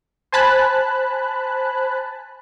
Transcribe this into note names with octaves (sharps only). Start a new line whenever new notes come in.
C5 G#5 A5 B5 F#6